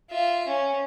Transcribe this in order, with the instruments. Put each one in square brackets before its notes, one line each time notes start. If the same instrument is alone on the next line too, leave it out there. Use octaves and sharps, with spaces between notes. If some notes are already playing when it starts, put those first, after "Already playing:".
[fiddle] F4 E5
C#4